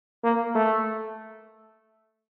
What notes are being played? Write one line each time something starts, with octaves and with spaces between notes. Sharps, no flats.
A#3
A3